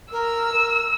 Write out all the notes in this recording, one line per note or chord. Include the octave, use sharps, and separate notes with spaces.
A#4 E6
A#4